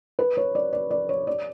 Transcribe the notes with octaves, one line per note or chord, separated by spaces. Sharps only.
B4
C#5
D5
D5
D5
C#5
D5